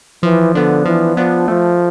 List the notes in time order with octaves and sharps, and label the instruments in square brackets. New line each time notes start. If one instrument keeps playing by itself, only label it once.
[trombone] E3 [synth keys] F3
[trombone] D3 [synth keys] B3 D4
[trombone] E3 [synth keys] F3
[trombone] F3 [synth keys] B3 D4
[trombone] F3 [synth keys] A3